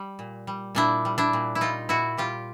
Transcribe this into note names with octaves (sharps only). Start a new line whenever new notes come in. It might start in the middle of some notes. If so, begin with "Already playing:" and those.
Already playing: G3
A#2
G3
A#2 D4 E4
G3
D4 E4
A#2
E4
G3 D#4 F4
A#2 E4 F#4
G3 F4 G4